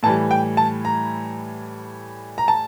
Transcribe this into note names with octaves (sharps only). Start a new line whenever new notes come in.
A2 E3 G3 A5
G5
A5
A#5
A#5
A5